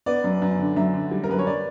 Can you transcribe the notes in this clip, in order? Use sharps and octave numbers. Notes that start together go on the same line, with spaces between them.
B3 D5
F#2
F#2
D3
F#2 E5
D3
G3
A#4
F#2 B4
C#5
D5